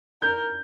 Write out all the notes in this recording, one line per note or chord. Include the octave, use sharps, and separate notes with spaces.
A#4 G6